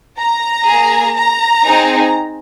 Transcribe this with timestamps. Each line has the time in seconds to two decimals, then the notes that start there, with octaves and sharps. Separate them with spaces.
0.18 A#5
0.67 A#3 G#4
1.15 A#5
1.64 C4 D#4 G#4